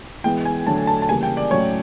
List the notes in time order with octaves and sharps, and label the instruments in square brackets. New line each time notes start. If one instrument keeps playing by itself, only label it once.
[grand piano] E3 G#3 B3 [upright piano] G5
[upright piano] G#5
[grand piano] D3 F#3 A3 D4 [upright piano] A5
[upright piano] A5
A5
[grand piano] C#3 E3 G3 A#3 [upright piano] G#5
[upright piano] G5
D5
[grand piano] A2 F#3 A3 C#4 E4 [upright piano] C#5